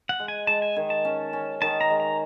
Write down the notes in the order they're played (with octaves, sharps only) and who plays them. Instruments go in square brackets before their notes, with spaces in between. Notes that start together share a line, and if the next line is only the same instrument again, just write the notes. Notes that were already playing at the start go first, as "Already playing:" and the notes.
[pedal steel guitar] F#5
[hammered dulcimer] G#3
[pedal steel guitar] G#5
[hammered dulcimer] G#3 [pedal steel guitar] A5
[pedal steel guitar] G#5
[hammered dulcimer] D#3
[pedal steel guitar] A5
[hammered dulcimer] C#4
C#4
[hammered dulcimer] D#3 [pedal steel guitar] A5
[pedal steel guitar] A#5
[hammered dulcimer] G#3
[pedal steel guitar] A#5